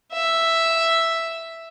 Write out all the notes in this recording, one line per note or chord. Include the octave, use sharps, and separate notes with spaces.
E5